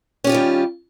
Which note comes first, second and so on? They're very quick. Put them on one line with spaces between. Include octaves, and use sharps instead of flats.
C#4 G4 F4 D#3 G3